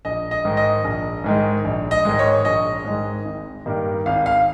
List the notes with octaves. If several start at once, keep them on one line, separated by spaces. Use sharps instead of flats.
A#1 D#5
D#5
G#2 D#3 G#3
D#5
A#1
G#2 D#3 G#3
A#1
D#5
G#2 D#3 G#3
C#5
A#1 D#5
G#2 D#3 G#3
G#1
G2 D#3 G3 A#3
G#1 F5
F5